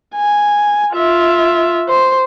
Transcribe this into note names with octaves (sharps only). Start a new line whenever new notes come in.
G#5
F4 E5
C5